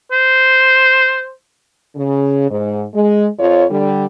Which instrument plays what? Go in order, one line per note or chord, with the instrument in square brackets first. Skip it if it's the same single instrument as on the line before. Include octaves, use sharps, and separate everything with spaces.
[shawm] C5
[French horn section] C#3
G#2
G#3
F2 F4 C#5
D3 G3